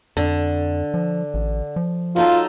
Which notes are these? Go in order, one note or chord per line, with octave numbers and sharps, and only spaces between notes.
F2 D3
F3
A1
F3
F#3 D#4 F4 A4